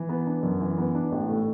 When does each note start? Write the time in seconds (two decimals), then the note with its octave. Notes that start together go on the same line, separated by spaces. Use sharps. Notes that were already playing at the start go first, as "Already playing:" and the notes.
Already playing: E3
0.09 B3
0.27 D4
0.43 F#2
0.61 E3
0.78 B3
0.95 D4
1.12 A1
1.29 A2